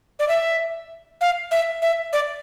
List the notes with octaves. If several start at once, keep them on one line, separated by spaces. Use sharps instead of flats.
D5
E5
F5
E5
E5
D5